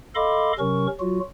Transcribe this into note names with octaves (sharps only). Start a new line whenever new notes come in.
A4 D#5 F5 B5 C6 D6
C3 F#3 C#4 A#4 C#6
F#3 F4 F#4